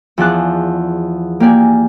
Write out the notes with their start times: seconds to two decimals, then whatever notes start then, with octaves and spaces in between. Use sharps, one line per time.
0.18 E2 F3 G#4 D5 A5 F#6
1.40 A#3 G4 D5 G#5